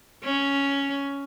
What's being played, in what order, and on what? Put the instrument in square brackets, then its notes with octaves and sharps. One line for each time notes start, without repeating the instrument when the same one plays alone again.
[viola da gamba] C#4